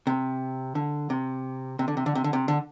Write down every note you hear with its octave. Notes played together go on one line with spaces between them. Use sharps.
C3
D3
C3
C3
D3
C3
D3
C3
D3
C3
D3